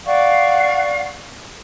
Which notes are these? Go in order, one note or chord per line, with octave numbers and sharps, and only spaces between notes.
D5 F5 F#5 C#6